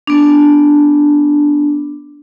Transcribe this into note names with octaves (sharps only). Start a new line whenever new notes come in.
B3 D4